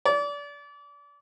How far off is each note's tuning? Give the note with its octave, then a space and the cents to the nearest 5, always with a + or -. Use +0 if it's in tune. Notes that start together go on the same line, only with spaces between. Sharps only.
D5 -30